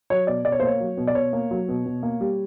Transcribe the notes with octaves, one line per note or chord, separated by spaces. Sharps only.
F#3 C#5
B2 D5
B2 D5
C#5
C5
A#3 C#5
F#3
B2
D5
B2 C#5
A#3
F#3
B2
B2
A#3
G3